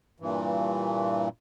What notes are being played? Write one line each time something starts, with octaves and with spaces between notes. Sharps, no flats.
G2 A#2 E3